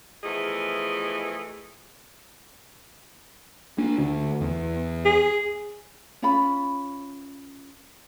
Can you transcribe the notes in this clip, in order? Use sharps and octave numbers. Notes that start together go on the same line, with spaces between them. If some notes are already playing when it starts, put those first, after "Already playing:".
E2 E3 F3 A3 G#4 D#5
A#3 D4
D2
E2
G#4
C#4 F4 B5